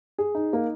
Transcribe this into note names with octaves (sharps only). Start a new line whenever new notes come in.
G#4
D#4
A#3